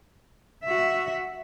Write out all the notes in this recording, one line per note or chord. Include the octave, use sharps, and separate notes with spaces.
F#4 E5